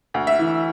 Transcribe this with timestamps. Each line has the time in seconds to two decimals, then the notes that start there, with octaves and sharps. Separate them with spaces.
0.14 D2
0.27 E5
0.39 E3